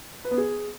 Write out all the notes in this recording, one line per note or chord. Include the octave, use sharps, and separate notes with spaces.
B4
B3
G#4